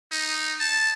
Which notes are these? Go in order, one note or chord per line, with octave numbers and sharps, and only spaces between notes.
D#4
A5